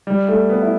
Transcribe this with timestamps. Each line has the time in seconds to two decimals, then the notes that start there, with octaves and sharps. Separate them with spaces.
0.07 G3
0.29 A3
0.49 B3
0.63 E4